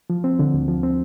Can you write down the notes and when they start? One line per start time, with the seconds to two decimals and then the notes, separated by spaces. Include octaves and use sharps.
0.10 F3
0.24 C4
0.39 D3
0.54 D2
0.68 F3
0.83 C4